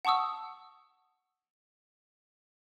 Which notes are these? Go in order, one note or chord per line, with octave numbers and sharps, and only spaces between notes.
F#5 A5 C#6 D#6 E6